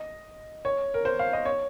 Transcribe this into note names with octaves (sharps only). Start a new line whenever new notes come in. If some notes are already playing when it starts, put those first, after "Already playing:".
Already playing: D#5
C#5
A#4
C5
F5
D#5
C#5